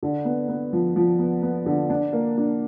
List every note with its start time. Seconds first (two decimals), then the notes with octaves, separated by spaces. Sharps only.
0.03 D3
0.25 B3
0.48 B3
0.73 F3
0.96 F3
1.19 B3
1.42 B3
1.66 D3
1.90 D4
2.13 A#3
2.37 D4